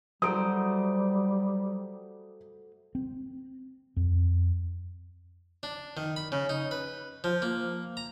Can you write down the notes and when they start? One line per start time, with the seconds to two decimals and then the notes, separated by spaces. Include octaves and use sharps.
0.22 F#3 G3 A3 F#4 C5 A#5 D#6 D7
2.95 C4
3.96 F2
5.63 D4
5.97 D#3
6.16 B5
6.32 C#3
6.49 D#4
6.71 B4
7.24 F3
7.42 A#3
7.97 A#5